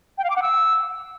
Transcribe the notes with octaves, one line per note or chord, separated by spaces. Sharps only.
G5
F5
D6
F#5
E6